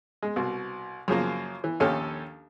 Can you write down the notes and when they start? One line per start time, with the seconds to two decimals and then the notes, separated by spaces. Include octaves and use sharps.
0.22 G#3
0.36 C2 B2
1.08 F#2 C#3 F3 A#3
1.64 E3
1.80 A#1 D#2 C#4 G4 A4 F6